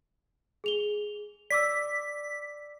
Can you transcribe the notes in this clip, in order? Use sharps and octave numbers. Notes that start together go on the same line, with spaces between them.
G#4 F7 G7
D5 D6 E6 B6